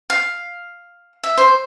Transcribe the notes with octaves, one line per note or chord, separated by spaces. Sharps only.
F5
E5
C5